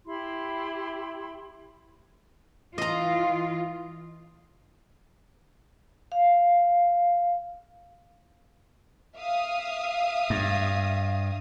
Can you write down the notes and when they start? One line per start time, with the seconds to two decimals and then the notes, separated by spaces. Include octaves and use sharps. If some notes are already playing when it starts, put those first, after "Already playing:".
0.06 E4 G4 B5 C6
2.78 E3 F4 D#5 A#5
6.12 F5
9.17 E5 F5 D#6
10.30 G2